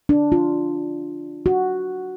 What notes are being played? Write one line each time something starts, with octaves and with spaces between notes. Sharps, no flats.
D4
F4
F#4